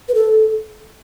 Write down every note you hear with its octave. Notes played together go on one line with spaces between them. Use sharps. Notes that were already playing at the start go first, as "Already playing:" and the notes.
B4
A4